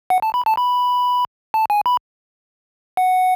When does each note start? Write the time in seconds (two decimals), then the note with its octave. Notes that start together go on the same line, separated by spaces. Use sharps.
0.10 F#5
0.22 A5
0.34 B5
0.46 A5
0.57 B5
1.54 A5
1.70 G#5
1.86 B5
2.97 F#5